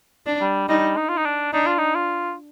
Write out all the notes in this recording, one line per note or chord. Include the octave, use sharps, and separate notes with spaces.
D4
G3
G3 D#4
D#4
F4
D#4
D4
D4 D#4
F4
D#4
F4